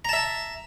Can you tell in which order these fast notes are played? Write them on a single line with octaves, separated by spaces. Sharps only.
A#5 A5 E5